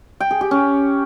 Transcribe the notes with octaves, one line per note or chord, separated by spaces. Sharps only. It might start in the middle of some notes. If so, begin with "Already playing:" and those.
G5
G#4
G4
C#4